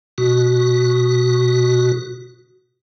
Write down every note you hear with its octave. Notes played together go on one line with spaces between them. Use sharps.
B2 F#4